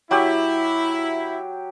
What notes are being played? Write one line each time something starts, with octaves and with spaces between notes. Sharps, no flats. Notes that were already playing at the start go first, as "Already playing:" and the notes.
F#3 E4 G4